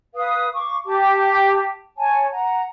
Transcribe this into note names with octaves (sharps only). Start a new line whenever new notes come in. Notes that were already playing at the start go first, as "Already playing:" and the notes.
B4 F5 D#6
F5 C#6 D6
G4 A5 D6
C#5 G#5 A5
F#5 A#5